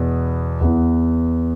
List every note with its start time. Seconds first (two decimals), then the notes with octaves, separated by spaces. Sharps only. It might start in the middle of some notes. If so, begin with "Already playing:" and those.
Already playing: E2 B2 B3
0.61 E2 E3 B3